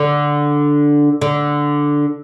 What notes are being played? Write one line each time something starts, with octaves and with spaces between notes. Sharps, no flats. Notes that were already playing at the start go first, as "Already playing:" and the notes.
Already playing: D3
D3